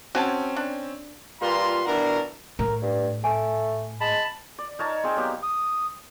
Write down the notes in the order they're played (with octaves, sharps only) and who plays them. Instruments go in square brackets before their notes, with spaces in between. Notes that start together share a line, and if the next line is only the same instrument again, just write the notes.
[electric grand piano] C4 C#4 [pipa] F#4 G#5 A5
[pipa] D4
[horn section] A#2 G3 F4 B4 A#5 C6
B2 E3 D4 F#4 A#4
[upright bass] A2 [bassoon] A#4
[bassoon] G2
[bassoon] A3 [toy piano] G#5
[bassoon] G#3 [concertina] A5 B5
[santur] D5
D#4 A#4 C#5 A5
C4 G#4 G5
F#3 A#3 B3 G4
[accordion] D#6